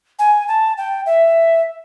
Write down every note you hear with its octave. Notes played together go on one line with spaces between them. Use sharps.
G#5
A5
G5
E5